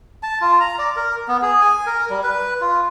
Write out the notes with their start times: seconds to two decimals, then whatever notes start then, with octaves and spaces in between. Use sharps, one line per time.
0.23 A5
0.41 F4
0.60 A#5
0.79 D5
0.96 A#4
1.28 B3
1.42 G#4
1.61 G#5
1.86 A#4
2.10 G3
2.24 B4
2.61 F4